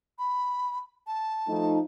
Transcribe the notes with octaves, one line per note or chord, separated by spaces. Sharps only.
B5
A5
F3 A3 D#4